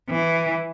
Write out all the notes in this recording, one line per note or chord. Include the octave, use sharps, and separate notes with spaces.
E3